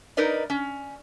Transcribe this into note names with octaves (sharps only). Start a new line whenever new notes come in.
D#4 A#4 B4 D5 D#5
C#4